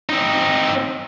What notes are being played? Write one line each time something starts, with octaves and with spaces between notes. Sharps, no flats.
C4 D#4